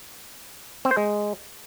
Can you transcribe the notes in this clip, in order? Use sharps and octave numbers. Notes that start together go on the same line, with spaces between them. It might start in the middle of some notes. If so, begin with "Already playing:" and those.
C4
C5
G#3